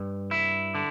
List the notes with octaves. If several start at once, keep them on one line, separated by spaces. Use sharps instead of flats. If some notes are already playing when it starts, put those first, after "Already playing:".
Already playing: G2
E4
D3